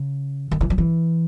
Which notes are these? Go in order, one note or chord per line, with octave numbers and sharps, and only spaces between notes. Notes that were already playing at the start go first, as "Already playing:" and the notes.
Already playing: C#3
D#3
E3
F3
E3